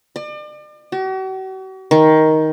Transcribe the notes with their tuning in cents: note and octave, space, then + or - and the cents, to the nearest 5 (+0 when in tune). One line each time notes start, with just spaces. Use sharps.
D5 +40
F#4 +45
D#3 +10